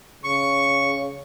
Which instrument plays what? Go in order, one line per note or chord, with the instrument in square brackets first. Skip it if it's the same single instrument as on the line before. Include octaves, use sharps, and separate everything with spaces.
[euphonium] C#3 [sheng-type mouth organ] C#6